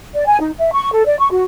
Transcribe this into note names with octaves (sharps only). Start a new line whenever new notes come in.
D5
G#5
D#4
E5
C#6
A4
D5
C#6
F#4